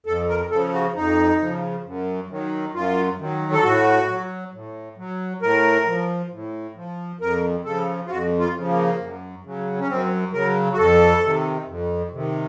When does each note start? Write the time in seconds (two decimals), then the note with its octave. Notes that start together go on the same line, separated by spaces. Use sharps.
0.06 F2 A4
0.29 A#4
0.51 C#3 F3 A4
0.74 F#4
0.96 F2 D#4
1.40 C#3 F3
1.85 F#2
2.30 D#3 F#3
2.74 F#2 F4
3.19 D#3 F#3
3.53 A4
3.63 A2 F#4
4.09 F#3
4.53 A2
4.97 F#3
5.42 A2 A#4
5.86 F3
6.31 A2
6.76 F3
7.21 F2 A#4
7.65 C#3 F3 A4
8.06 F4
8.10 F2 F#4
8.39 F4
8.54 C#3 F3
8.69 A#3
9.00 F#2
9.44 C#3 F#3
9.79 C#4
9.89 F#2 C4
10.33 C#3 F#3 A#4
10.73 F#4
10.78 F2 A4
11.22 C3 D#3
11.67 F2
12.11 C3 D#3